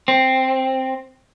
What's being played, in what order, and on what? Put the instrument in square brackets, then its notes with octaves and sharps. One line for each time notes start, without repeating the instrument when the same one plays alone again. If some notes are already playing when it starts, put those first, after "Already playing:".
[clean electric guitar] C4